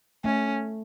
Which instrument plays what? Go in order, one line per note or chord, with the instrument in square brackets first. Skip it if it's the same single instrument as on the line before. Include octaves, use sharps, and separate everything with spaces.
[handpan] A3 [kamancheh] C#4